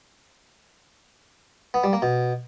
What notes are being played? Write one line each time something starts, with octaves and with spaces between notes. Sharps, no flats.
B3
G3
A#3
B2